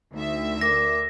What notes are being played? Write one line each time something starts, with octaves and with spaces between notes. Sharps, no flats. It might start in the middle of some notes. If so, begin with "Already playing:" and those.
D2 D#4 E5
A#4 D5 D6 A#6